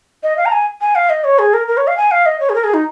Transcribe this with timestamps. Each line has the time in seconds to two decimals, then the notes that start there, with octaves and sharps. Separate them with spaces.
0.23 D#5
0.37 F5
0.45 A#5
0.52 G#5
0.81 G#5
0.95 F5
1.10 D#5
1.24 C#5
1.39 G#4
1.54 A#4
1.68 A#4
1.77 C#5
1.87 F5
1.97 G#5
2.11 F5
2.26 D#5
2.40 C#5
2.49 G#4
2.55 A#4
2.64 G#4
2.74 D#4